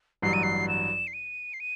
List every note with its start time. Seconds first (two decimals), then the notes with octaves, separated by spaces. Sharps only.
0.22 A1 G2 F#3 C7
0.33 D#7
0.43 C7
0.68 E7
1.07 C7
1.13 D#7
1.53 C7
1.60 D#7